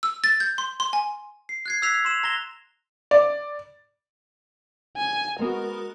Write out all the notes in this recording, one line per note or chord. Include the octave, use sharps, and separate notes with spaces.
E6
A6
G6
C6
C6
G#5
C7
F#6 G#6 C7
E6 F#6 G#6 B6 C7 F7
C6 E7 F7
A#5 A#6 G7
D5
G#5
G#3 B3 F#4 A#4